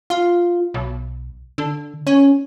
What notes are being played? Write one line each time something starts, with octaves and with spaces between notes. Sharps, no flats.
F4
B1
D3
C#4